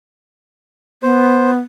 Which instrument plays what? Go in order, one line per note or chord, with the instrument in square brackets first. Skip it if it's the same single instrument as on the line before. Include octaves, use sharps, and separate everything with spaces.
[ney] B3 [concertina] C5